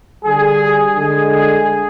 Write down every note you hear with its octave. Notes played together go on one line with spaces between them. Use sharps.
D3 G3 G#4
D3 G#3 G#4
G#4